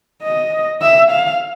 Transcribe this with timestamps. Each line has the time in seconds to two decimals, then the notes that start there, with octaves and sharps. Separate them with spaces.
0.23 D#5
0.82 E5
1.11 F5